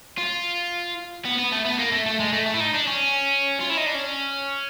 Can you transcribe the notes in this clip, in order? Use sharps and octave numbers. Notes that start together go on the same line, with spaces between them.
F4
B3
B3
A3
B3
A#3
A3
A3
G#3
A3
A3
E4
D#4
D4
C#4
F4
E4
D#4
D4
C#4